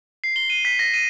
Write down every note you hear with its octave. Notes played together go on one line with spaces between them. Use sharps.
C7
G7
D#7
B6
A#6
D#7